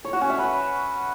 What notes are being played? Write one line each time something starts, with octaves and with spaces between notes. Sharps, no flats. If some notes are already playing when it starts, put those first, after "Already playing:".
C#5
F#4
C#4
E5
B4